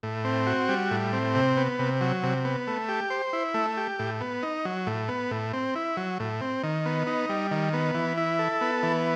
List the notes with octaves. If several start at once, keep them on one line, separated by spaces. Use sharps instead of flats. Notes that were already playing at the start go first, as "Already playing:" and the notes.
A2
C4
F#4
G3
A2
C4
C3
B3
C3
F#3
C3
B3
A3
G4
C5
E4
A3
G4
A2
B3
D#4
F#3
A2
B3
A2
C4
E4
F#3
A2
C4
D#3
B3
D#4
G3
D#3
B3
E3
E4
A4
B3
E3